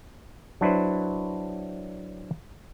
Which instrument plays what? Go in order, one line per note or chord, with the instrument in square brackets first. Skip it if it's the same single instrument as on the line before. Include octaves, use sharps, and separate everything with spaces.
[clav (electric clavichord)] F#3 D4 E4 B4 C5